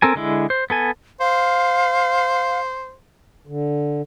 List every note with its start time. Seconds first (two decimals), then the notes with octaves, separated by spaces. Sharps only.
0.02 C4 A4 A#4 G#5
0.15 D3 G#3 E4
0.50 C5
0.70 B3 A4 G#5
1.20 C5 F5
3.47 D3